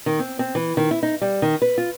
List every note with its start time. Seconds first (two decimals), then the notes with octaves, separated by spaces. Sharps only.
0.06 D#3
0.19 C4
0.39 C4
0.55 E3
0.77 D#3
0.91 E4
1.03 D#4
1.21 G3
1.42 D#3
1.62 B4
1.78 F4